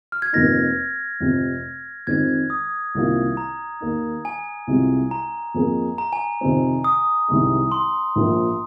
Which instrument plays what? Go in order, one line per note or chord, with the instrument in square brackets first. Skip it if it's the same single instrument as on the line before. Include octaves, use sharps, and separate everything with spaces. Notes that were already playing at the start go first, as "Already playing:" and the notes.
[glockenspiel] F6
G#6
[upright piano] F1 F2 F3 A#3 D#4 [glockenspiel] A#6
[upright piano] F1 F2 C3
[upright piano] F2 D#3 G#3 C4 [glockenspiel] G#6
[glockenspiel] D#6
[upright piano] C2 C3 D#3 A#3 F4
[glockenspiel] A#5
[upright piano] D#2 D#3 A#3 D#4
[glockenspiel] G#5
[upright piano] C2 C3 G#3 F4
[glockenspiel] A#5
[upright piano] F2 F3 A#3 G#4
[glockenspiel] A#5
G#5
[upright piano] F2 C3 D#3 C4
[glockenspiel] D#6
[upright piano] C2 C3 D#3 G#3
[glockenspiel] C6
[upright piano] A#1 A#2 F3 A#3